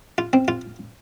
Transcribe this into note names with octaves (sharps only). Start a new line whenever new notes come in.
F4
C4
F4